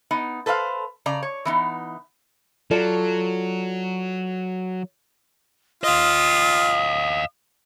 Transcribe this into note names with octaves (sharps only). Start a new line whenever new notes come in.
B3 D#4
A4 B4 C5 E5 F5
C#3 D5 A#5
C#5
E3 B3 D#4
F#3 F4 A4 D5
F4 D#5 F5 D#6